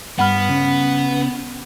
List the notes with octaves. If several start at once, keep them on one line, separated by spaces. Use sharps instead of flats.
G2 B3 F#5 B5 F6
C#3